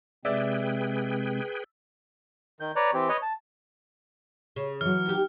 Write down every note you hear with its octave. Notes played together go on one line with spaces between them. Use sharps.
C3 G#3 C4 G#4 B4 D5 E5 G5
D#3 G6
B4 C#5 D5 A#5
E3 C4 G4
B4 C#5 D#5
A5
C#3
E3 F#3 F6
D#2 G4